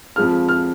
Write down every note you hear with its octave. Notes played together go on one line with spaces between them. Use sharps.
F2 F3 G#3 F4 F6
F6